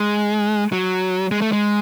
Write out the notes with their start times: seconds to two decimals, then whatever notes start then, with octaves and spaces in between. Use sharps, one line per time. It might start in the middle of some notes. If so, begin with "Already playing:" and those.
Already playing: G#3
0.72 F#3
1.31 G#3
1.42 A3
1.52 G#3